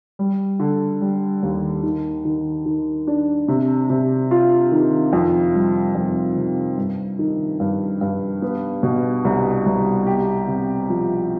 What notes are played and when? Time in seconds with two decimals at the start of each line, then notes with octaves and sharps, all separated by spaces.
0.19 G3
0.59 D3
1.01 G3
1.43 D#2
1.83 D#3
2.25 D#3
2.66 D#3
3.07 D4
3.48 C3
3.90 C3
4.31 F4
4.72 D#3
5.13 F2
5.54 G3
5.95 F2
6.36 C3
6.77 G2
7.19 D#3
7.60 G2
8.01 G2
8.42 B3
8.83 B2
9.25 C2
9.66 C2
10.07 G4
10.48 C3
10.89 F3